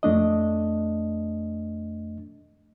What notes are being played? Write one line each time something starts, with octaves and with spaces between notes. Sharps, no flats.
F2 A3 D4 D#5